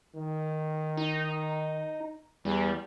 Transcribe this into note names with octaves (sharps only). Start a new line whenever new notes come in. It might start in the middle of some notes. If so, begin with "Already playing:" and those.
D#3
D#4
E2 G3